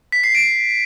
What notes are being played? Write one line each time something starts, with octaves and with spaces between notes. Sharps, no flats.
B6
C7
D7